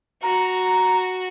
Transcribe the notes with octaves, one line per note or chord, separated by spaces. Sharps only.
F#4 A#5